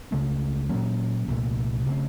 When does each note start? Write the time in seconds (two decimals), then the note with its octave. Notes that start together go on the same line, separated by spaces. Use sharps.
0.11 C#2 C#3 A3 C#4
0.69 A#2 F#3 A#3 C#4
1.28 C2 A#2 A3
1.87 C#3 A3 C4